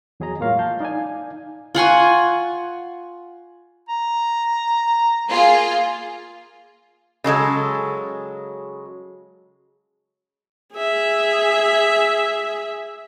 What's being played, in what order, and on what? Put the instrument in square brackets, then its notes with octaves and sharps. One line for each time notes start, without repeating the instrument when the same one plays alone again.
[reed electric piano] E2 F#3 G#4 D#5 A#5
A2 G#3 A#3 F4 C#5 F5
F5 A5 G6
D#4 D5 F5 G#5
[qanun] F4 F#5 G#5 C#6
[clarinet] A#5
[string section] A#3 F4 G#4
[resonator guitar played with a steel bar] C#3 F#3 G#3 A4
[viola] G#4 E5